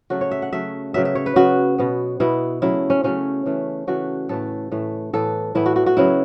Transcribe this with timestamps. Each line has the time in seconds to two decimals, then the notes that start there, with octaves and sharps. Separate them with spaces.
0.10 C#3 F#3 A3 F#4
0.21 C#5
0.31 E5
0.42 F#5
0.53 C#3 F#3 A3 E5
0.94 C#3 F#3 B3 E5
1.05 E5
1.15 C#5
1.26 B4
1.36 C#3 F#3 B3 F#4
1.78 B2 B3
2.20 B2 B3 E4
2.62 C#3 F#3 A3 E4
2.90 C#4
3.04 C#3 F#3 A3 C#4
3.46 C#3 E3 A3
3.87 C#3 E3 A3 F#4
4.29 A2 E3 A3 A4
4.72 A2 E3 A3
5.13 A2 E3 B3 A4
5.55 A2 E3 B3 E4
5.66 F#4
5.76 F#4
5.86 F#4
5.97 C#3 F#3 B3 E4